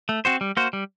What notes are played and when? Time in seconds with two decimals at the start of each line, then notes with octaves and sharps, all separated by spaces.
0.09 A3
0.25 C4 F#4 C5
0.41 G3
0.57 A#3 F#4 C5
0.73 G3